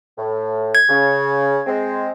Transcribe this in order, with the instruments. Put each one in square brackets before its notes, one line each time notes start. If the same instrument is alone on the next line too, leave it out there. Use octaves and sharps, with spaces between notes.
[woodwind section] A2
[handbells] G#6
[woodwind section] C#3
G#3 C4